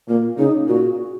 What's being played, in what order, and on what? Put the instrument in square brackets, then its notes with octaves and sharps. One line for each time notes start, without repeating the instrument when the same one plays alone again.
[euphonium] A#2 [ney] A#3
[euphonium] C#3 [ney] D#4
[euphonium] A#2 [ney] F#4